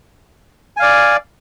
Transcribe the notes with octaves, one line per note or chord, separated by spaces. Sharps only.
D5 F5 G#5